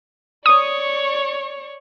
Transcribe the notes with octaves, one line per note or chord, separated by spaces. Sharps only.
C#5 D5 C#6 D#6